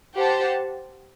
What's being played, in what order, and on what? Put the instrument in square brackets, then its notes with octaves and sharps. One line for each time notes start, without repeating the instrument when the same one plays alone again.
[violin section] G4 C5 F#5 A5